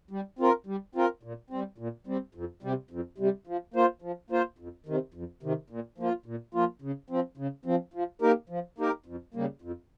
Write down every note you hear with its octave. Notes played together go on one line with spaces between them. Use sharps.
G3
C4 F4 A#4
G3
C4 F4 A#4
A#2
G3 C4
A#2
G3 C4
F2
C3 G3
F2
C3 G3
F3
A#3 F4 C5
F3
A#3 F4 C5
F2
C3 D#3
F2
C3 D#3
A#2
F3 A#3 F4
A#2
F3 A#3 F4
C#3
F3 C4
C#3
F3 C4
F3
A#3 D#4 G4 A#4
F3
A#3 D#4 G4 A#4
F2
C#3 G3 A#3
F2